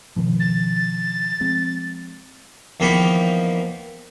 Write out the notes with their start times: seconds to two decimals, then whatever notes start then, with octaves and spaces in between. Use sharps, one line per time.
0.16 B2 D#3 F3
0.40 A6
1.40 F3 G#3 C4
2.80 E2 D#3 F3 A#3 B5 C#6